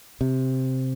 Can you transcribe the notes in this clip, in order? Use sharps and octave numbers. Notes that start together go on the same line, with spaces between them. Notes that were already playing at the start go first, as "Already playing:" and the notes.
C3